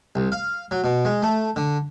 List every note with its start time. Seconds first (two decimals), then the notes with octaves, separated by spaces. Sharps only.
0.15 C2
0.32 F5
0.71 F#3
0.84 B2
1.05 G#3
1.22 A3
1.56 D3